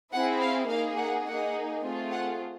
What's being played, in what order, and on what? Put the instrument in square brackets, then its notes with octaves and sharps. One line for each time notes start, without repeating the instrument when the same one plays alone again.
[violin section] C4 E4 G#4 F#5
F5
A#3 D#4 G#4 F5
F#5
A#3 D#4 G#4 F#5
A3 C4 F4 G#4
F#5